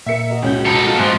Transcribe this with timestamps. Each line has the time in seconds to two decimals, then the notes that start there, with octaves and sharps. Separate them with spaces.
0.06 A#2 A#4 E5 C#7
0.30 F#4 A#4 D#5
0.42 C#2 C#4 G6
0.66 C#2 B2 A4 A#5 B5 D6
0.87 F4 F6
0.99 G#2 F3 G#3 G#5 D6 F6 F#6